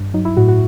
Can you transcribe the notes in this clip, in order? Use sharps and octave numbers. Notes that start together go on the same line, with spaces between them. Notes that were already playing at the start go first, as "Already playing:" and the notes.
Already playing: G2
F#3 D#4
E4
A2 F#4
F#4